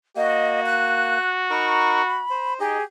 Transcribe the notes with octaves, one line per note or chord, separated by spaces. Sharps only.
A#3 F#4 D#5
F#6
D#4 A#4 B5 C#6
C5
D#4 G4 G#4 D#5